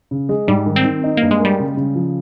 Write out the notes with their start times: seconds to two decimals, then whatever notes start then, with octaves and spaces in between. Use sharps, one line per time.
0.11 C#3
0.29 G#3
0.48 G#2 G3
0.66 D#3
0.76 C4
0.85 D#3
1.04 D#4
1.17 G2 A#3
1.31 G#3
1.40 G3 A#3
1.59 C#3
1.77 C#3
1.95 F3